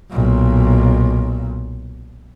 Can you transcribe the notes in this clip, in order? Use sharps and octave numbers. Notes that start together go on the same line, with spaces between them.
B1 A#2